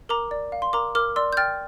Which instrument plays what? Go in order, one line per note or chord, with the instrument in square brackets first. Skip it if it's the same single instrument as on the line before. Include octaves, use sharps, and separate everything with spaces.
[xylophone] A#4 A#5 D6
D5
F5
C6
A#4 A#5 D6
A#4 D6 F6
D5 C6 E6
G6
G5 F6 A6